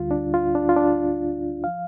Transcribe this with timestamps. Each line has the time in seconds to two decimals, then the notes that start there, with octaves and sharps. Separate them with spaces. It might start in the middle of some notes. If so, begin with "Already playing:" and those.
Already playing: D2 D3 G3 F4
0.11 D4
0.34 F4
0.55 D4
0.69 F4
0.76 D4
1.64 F3 F5